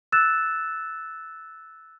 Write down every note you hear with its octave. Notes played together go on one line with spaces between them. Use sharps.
E6 F#6 A6 E7